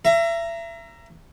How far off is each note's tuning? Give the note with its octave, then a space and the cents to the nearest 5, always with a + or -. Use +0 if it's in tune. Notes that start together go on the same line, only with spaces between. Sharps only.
E5 +30 A#5 +0